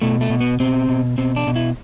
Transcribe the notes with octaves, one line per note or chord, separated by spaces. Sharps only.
B2 A3
A3
B2
B3
B2 C4
B2
B2 C4
D4
B2
E4